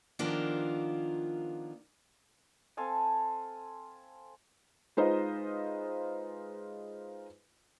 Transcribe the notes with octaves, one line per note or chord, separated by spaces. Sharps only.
D#3 F3 A#3 B3 D4 F4
C4 A4 F5 G#5
G#3 D#4 F4 B4 C5 D#5